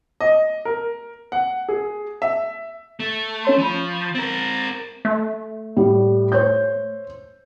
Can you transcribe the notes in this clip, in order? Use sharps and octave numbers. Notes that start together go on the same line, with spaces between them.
D#5
A#4
F#5
G#4
E5
A3
C#4 C#5 C6
F3 B5 C#6 D#7
C4 A#4 A6
A3
A2 G3
C5 C#5 G6